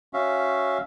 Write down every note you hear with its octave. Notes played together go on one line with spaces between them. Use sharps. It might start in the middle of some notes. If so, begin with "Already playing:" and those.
C#4 F#4 E5 F5